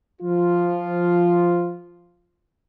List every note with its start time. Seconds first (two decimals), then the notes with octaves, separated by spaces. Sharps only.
0.22 F3 F4